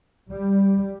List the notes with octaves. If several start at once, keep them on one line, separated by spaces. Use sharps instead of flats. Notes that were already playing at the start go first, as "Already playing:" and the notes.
G3